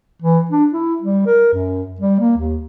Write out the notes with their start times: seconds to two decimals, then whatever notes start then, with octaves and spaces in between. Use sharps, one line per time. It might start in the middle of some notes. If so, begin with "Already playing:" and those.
0.22 E3
0.51 D4
0.73 E4
1.02 G3
1.26 A#4
1.53 F#2
2.00 G3
2.19 A#3
2.37 D#2